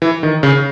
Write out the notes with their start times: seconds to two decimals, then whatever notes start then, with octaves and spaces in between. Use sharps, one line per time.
0.02 E3
0.23 D#3
0.43 C#3